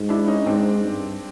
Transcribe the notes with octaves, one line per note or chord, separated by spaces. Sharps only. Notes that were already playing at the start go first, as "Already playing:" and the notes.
Already playing: G#2
D4 E4
C#4 D#4
G#2 C4 D4
G2